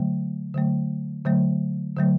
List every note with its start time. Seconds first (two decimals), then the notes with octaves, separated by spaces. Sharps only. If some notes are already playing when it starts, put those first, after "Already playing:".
Already playing: D3 F#3 A3
0.54 D3 F#3 A3
1.25 D3 F#3 A3
1.97 D3 F#3 A3